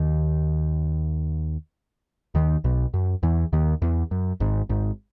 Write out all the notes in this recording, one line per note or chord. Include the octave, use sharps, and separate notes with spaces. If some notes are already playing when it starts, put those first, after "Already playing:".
Already playing: D#2 D#3
D#2 D#3
B1 B2
F#2
E2 E3
D#2 D#3
E2
F#2
G#1 G#2
G#1 G#2